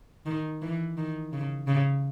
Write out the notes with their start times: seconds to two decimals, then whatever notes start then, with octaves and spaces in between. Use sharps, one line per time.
0.26 D#3
0.62 E3
0.97 D#3
1.33 C#3
1.67 C#3